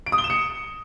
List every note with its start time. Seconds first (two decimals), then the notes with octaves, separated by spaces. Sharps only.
0.06 D7
0.12 D#6
0.18 G7
0.24 E7
0.30 C#7